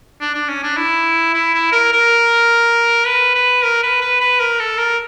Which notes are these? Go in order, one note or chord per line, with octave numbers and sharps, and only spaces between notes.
D4
D4
C#4
D4
E4
E4
E4
A#4
A#4
B4
B4
A#4
B4
B4
B4
A#4
A4
A#4